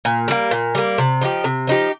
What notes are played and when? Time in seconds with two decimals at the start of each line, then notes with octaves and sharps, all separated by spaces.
0.05 A#2
0.28 G3 A#3
0.51 A#2
0.75 G3 A#3
0.98 C3
1.21 F3 D#4 G4
1.44 C3
1.67 F3 D#4 G4